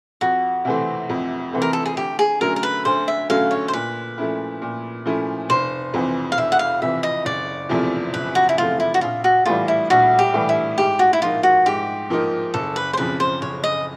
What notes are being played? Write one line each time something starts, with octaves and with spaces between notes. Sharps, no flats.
F2 F#4
C3 E3 A3 C4
F2
C3 E3 A3 C4
A#4
A4
G#4
D2 G4
G#4
D3 F#3 A3 C#4 A#4
A#4
B4
D2 C5
E5
D3 F#3 A3 C#4 F5
C#5
C5
A#2 B4
F3 A3 C#4 E4
A#2
F3 A3 C#4 E4
F1 C5
F2 C3 E3
F5
F1 E5
F#5
F5
F2 C3 E3 E5
D#5
F#1 D5
E2 C3 F3 A3
F#1 B4
F#4
E4
E2 C3 F3 A3 F4
E4
F#4
A#1 F4
F#4
A2 E3 G3 F4
E4
A#1 F#4
G4
A2 E3 G3
E4
G#2 G4
F#4
E4
F3 A#3 D#4 F4
F#4
G#2 G4
F3 A#3 D#4
F#1 A4
B4
C5
F2 C#3 F3 B4
C5
F#1 C#5
D#5